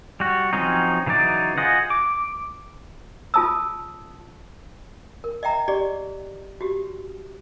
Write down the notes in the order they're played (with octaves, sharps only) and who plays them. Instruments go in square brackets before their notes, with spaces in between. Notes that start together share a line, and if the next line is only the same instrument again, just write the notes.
[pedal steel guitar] G3 F#4
F3 F#3 C4 C#4 D#4
C#3 E3 F#3 D#4 D5
F4 G#4 C5 D#5 F#5
D6
[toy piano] F4 G#4 A5 D#6 E6
A#4
D#5 E5 G5 A#5
G4 G#4 D5 D#5
F#4 G4